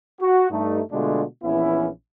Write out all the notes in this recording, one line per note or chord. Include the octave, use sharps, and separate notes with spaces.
F#4
G2 A3 D#4
B2 D3 G#3 A3 D4 F4
A#1 E3 B3 C#4 E4